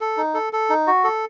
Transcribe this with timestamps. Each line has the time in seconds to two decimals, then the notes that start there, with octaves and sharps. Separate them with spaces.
0.01 A4
0.17 D#4
0.34 A4
0.53 A4
0.70 D#4
0.87 F#4
1.04 A4